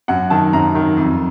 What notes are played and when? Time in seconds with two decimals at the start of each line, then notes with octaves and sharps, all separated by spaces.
0.08 F#2 F#5
0.30 D#3 A5
0.53 F#2 A#5
0.75 D#3
0.97 F2